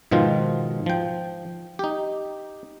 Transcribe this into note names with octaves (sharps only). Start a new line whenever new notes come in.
G#2 B2 D#3 F3 F4
F3 G5
D#4 G4